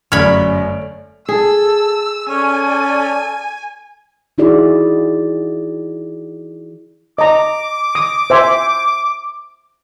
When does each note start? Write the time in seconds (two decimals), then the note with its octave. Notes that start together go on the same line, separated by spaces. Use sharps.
0.12 G1 F#2 A3 C#5 D5 B5 F6
1.29 G#4 A4 E6
2.29 C#4 A4 D5 G#5
4.38 E3 D#4 E4 F#4 G#4 D5
7.18 D#5 A#5 D6
7.95 D#6
8.30 C5 E5 G#5